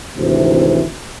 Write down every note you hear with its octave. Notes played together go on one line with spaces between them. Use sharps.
G#1 D2 C3 E3